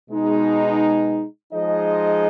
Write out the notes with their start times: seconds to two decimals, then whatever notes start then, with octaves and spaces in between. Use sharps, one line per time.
0.10 B2 G#3 D#4
1.53 F3 G#3 D#4 G#4 D#5